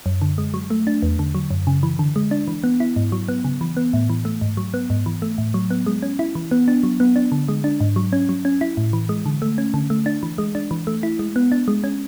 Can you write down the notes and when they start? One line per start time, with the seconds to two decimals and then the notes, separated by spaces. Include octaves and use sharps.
0.06 F#2
0.22 D3
0.38 G#3
0.54 F#3
0.70 A3
0.87 D4
1.03 E2
1.19 D3
1.35 F#3
1.51 F#2
1.67 C#3
1.83 E3
1.99 D3
2.16 G#3
2.31 D4
2.48 E3
2.64 B3
2.80 E4
2.96 G#2
3.12 F#3
3.29 B3
3.44 C#3
3.61 E3
3.77 B3
3.93 A2
4.10 E3
4.25 A3
4.41 G#2
4.57 F#3
4.74 B3
4.90 G#2
5.06 E3
5.22 A3
5.38 A2
5.54 F#3
5.71 B3
5.86 G#3
6.03 C#4
6.19 E4
6.35 E3
6.51 B3
6.68 D4
6.83 F#3
7.00 B3
7.16 D4
7.32 D3
7.48 G#3
7.64 D4
7.81 G#2
7.96 F#3
8.13 C#4
8.29 F#3
8.45 C#4
8.61 E4
8.77 A2
8.93 E3
9.09 G#3
9.26 D3
9.42 A3
9.58 C#4
9.74 D3
9.90 A3
10.06 D4
10.23 E3
10.38 G#3
10.55 D4
10.71 E3
10.87 A3
11.03 E4
11.19 G#3
11.36 B3
11.52 D4
11.68 G#3
11.84 C#4